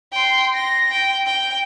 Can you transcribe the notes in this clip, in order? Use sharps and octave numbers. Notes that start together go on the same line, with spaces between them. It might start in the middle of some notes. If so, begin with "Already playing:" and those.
G5 C6
A#6
G5
G5